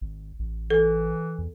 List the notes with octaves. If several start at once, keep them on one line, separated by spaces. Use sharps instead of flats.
G#1
A1
E3 A4
E2